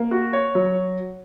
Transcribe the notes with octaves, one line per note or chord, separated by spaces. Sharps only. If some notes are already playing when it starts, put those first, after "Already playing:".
Already playing: A#3
F#4
C#5
F#3